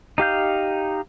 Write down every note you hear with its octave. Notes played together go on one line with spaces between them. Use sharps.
D#4 G4 F5 G6